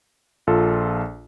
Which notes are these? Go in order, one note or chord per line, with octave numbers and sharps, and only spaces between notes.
A#1 F4 A4